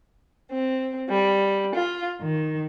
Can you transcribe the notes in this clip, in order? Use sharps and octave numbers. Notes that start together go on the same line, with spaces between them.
C4
G3
F4
D#3